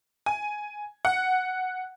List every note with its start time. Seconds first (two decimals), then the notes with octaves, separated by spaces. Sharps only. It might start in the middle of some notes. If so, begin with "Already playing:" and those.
0.26 G#5
1.05 F#5